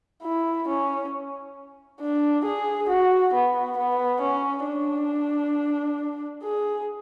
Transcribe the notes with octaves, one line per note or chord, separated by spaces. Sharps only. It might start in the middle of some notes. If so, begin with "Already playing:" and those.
E4
C#4
D4
G#4
F#4
B3
B3
C#4
D4
G#4